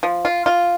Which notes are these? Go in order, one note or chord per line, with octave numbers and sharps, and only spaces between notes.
F3
F4
F4